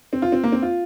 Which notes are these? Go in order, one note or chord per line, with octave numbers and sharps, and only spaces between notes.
C4
F4
C4
A#3
C4
F4